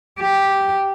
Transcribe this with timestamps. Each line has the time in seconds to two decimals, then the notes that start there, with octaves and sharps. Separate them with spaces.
0.20 G4